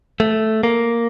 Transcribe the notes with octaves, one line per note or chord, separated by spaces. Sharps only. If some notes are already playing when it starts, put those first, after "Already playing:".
A3
A#3